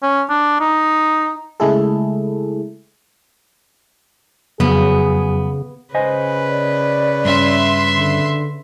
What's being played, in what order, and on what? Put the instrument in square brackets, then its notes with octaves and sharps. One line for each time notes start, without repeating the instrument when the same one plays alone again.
[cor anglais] C#4
D4
D#4
[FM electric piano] C#3 G#3 A3 E4 G#4 A4
[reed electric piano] F2 F#3 [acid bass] C#3 [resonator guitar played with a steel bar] B3 [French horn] G#4
[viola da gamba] C#3 B4 [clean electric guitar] C5 D#5 G#5
[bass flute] D5
[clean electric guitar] G2 C#4 [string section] E5 C6
[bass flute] D3